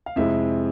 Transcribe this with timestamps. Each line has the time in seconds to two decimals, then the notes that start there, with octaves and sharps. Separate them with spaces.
0.06 F5
0.16 F2 C3 G#3 C4 E4 E5